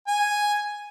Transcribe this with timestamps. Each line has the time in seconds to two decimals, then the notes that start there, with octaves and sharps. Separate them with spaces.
0.07 G#5